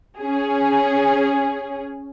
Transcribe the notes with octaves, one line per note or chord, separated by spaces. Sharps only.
C#4 G#4